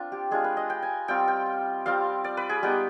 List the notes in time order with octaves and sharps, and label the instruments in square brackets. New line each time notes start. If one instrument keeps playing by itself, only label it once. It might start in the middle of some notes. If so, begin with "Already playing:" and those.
Already playing: [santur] C4 D4 F4
G4
G#3 D4 F4 G#4
B4
D#5
G5
G#5
G3 C4 F4 G5
G5
G3 C4 F4 F5
D5
B4
G#4
G3 B3 D#4 G4